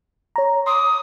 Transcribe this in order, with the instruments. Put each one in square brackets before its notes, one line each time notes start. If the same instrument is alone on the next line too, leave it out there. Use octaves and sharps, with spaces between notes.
[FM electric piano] C#5 A#5
[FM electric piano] C6 D6 [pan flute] D#6